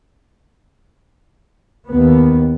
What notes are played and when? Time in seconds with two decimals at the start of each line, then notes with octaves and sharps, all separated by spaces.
1.89 D#2 B3